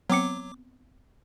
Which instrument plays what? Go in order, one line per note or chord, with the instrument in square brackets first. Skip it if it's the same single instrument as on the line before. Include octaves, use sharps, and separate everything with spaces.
[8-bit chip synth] F#3 D6 [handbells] B3 C4 C#7